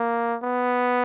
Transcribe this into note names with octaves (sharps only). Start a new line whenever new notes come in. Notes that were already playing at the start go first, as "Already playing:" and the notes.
Already playing: A#3
B3